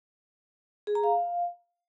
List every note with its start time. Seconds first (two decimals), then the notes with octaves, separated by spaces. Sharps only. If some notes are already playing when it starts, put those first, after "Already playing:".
0.87 G#4
0.95 A#5
1.04 F5